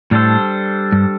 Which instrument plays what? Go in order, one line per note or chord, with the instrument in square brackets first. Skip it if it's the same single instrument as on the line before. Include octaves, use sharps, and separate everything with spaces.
[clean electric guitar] A2 [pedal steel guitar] G3 D4 A4 C5
[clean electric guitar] G2